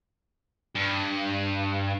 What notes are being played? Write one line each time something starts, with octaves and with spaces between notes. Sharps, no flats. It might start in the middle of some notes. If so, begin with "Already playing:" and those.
G2